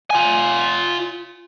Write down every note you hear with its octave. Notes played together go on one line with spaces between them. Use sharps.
F4 G#5